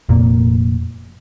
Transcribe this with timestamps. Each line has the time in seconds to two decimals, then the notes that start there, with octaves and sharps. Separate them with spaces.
0.09 F1 F2 A#2 A#3